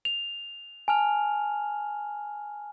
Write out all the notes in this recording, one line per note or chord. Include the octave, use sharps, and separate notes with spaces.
F7
G#5 A5 F6 F7